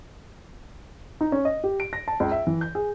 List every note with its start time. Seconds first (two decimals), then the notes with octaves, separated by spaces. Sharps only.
1.21 D#4
1.32 C#4
1.45 D#5
1.64 G4
1.80 D7
1.93 A#6
2.08 A5
2.20 C#2
2.31 E5
2.47 E3
2.61 G6
2.75 G#4